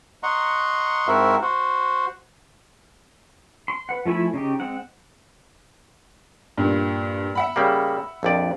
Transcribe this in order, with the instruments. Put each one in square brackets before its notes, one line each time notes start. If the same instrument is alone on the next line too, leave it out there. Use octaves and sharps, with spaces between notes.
[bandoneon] D#5 F#5 A#5 C6 C#6
G#2 C4 E4 F#4 A#4 E5
F#4 C5
[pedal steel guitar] C6
B4 F#5
F3 A3 E4 G#5 B5
C#3 D#4 G4
G#3 C4 F#5
[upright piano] G2 A#2
E5 F#5 B5
[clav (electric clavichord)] C#3 G3 A#3
A#1 F2 D5